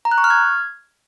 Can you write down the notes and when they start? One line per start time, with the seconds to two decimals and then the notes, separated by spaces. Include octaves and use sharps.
0.05 A#5
0.11 F#6
0.18 C#6
0.24 F6
0.30 G#6